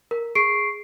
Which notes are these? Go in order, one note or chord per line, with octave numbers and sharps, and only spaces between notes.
A#4
G#4 C#6 C7 D7